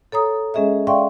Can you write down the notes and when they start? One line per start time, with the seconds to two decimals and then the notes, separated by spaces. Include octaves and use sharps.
0.12 A4 C#5 A#5 D#6
0.54 G#3 C#4 G#4 D#5 E5
0.87 D5 E5 F5 G5 C6 C#6